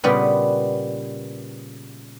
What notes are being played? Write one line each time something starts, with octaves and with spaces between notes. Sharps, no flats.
A#2 C#3 G3 B3 B4